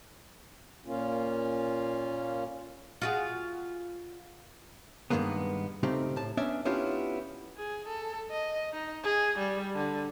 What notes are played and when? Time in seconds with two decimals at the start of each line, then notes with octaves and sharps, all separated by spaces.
0.85 A#2 A#3 C#4 F4
3.02 F4 F#4 G#4
5.10 G2 B2 D#3 G#3 A#3 B3
5.83 C#3 A3 C4 D#4 G4
6.16 A2 A5
6.37 B3 C#4 D4 D5 E5
6.65 B3 C#4 D4 E4 F4 G4
7.57 G#4
7.88 A4
8.31 D#5
8.73 D#4
9.04 G#4
9.38 G3
9.75 D3